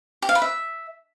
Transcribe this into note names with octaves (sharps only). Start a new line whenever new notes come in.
G4
F5
B4
E5